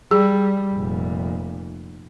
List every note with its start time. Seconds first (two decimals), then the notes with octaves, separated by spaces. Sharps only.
0.11 G3 G#4
0.74 F1 A#2